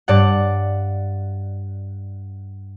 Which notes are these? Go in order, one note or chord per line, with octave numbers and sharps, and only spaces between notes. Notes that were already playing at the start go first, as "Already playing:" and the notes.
G2 D5 F#5